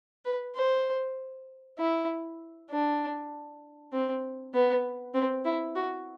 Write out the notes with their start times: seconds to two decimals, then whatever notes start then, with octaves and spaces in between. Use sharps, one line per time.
0.25 B4
0.55 C5
1.79 E4
2.70 D4
3.92 C4
4.54 B3
5.14 C4
5.45 E4
5.75 F#4